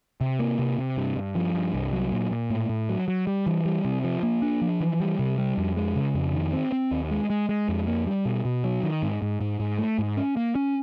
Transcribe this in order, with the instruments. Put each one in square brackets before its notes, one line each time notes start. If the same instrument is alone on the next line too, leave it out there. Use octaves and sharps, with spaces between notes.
[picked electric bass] C3
A#3
C3
C3
G2
G2
F3
G2
C2
F#3
A#2
A#2
A2
A2
F#3
F#3
G3
E3
G3
C3
F3
A#3
D4
F3
E3
G3
C3
G3
F2
G#3
C#3
F2
D#3
C4
C4
D#2
G#3
G#3
G#3
F2
A#3
G3
B2
B2
F#3
D#3
G#2
G#2
G#2
G#2
A3
G#2
C#4
A#3
C#4